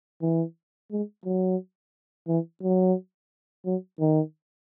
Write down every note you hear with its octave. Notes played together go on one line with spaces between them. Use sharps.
E3
G#3
F#3
E3
F#3
F#3
D#3